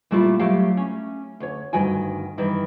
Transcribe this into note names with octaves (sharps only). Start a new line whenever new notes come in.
A#2 G3 A3 D4 E4 F4
F#3 G3 A3 G4 F5 G5
C#4
D2 C#5
D2 G2 D#3 F#4 G5 G#5
G2 D#3 E3